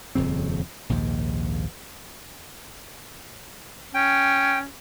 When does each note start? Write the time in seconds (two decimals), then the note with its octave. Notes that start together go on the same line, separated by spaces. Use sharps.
0.15 D#1 F2 C#3 C4
0.89 A#1 D#2 G#2
3.95 C#4 G5